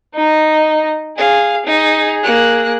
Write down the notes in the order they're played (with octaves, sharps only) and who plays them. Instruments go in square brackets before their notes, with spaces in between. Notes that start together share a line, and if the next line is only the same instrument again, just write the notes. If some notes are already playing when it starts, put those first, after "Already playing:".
[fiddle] D#4 D#5
[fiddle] G#4 [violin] F5
[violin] D#4 [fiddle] G#4
[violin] A#3 F#6